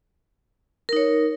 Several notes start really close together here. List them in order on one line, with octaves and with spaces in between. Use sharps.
A#4 D#4 C#5